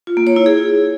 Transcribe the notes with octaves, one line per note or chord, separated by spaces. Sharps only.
F4
A#3
C#5
E4
G#4